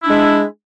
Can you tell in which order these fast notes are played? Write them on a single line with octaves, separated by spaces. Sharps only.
E4 D4 G#3